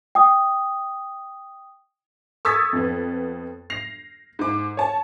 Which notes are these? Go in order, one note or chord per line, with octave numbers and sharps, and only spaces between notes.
G5 D#6
C#6 D#6 E6 G#6 A6 B6
F2 B3
A#6 C7 F7
G#2 D6
C#5 A5